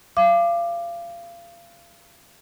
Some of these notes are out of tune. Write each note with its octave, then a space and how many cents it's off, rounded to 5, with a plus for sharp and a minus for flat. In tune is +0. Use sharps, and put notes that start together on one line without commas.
F5 -30 D6 +15